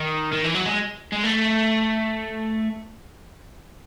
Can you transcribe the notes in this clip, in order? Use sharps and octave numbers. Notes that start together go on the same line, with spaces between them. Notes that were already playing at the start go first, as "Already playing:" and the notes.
Already playing: D#3
D#3
E3
F#3
G#3
G#3
A3